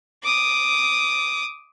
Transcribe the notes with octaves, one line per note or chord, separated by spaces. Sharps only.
D6 D#6